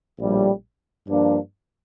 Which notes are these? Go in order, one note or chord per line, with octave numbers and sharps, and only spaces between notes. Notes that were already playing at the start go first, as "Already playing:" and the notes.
A#1 A2 G3
G2 F3 A#3 D4